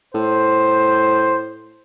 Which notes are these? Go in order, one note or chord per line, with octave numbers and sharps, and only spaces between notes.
A2 C5